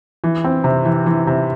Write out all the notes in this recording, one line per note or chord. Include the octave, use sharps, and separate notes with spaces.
E3
C4
C3
E3
E3
C3